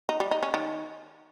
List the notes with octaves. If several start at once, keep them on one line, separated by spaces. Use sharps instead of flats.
D#4
G3
D#4
C#4
D#3